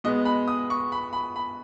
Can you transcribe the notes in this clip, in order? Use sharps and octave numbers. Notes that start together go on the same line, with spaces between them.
B2 G#3 B3 D#5
B5
D#6
C#6
B5
B5
B5